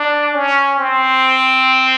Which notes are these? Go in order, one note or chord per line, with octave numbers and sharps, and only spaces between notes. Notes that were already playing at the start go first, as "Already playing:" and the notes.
Already playing: D4
C#4
C4